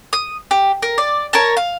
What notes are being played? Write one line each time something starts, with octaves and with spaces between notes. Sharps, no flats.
D#6
G4
A#4
D5
A#4 C#5 A5
F5